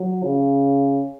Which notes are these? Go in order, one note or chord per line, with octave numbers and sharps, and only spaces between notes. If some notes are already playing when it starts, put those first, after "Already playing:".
Already playing: F#3
C#3